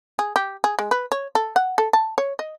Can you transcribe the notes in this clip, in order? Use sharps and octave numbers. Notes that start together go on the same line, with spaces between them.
G#4
G4
G#4
G#3
B4
C#5
A4
F#5
A4
A5
C#5
D#5